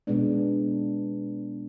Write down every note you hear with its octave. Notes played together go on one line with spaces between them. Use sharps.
B2 G#3 B3 D4